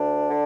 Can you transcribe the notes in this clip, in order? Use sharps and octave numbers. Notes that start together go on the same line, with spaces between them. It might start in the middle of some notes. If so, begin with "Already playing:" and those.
Already playing: D2 D4
D3